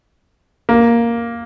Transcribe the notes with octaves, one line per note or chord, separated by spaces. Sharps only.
A#3